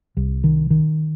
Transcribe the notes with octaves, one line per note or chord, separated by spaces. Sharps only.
C2
D#3
D#3